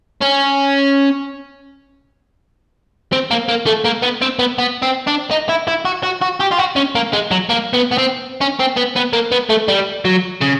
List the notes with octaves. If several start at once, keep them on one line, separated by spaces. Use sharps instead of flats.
C#4
C4
A#3
A#3
A3
A#3
B3
C4
B3
B3
C4
D4
D#4
E4
E4
F#4
F#4
F#4
G4
F4
F#4
C#4
A#3
G#3
F#3
A#3
B3
B3
C4
C#4
C4
B3
B3
A#3
B3
A3
G3
F#3
C#3